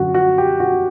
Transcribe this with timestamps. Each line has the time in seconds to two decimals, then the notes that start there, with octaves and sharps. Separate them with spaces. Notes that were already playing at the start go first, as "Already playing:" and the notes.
Already playing: F#2 D3 F#3 F#4
0.14 F#4
0.38 G4
0.60 F#4